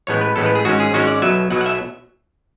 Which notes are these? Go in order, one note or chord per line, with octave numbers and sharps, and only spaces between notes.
A1 A2 G#3 B3 C#5
B4
A1 A2 G#3 B3 A4
B4
G#4
G#1 G#2 G#3 C#4 F#4
G#4
G#1 G#2 G#3 C#4 F#4
D5
B1 B2 F#3 E5
B1 B2 F#3 F#5
F#5
E5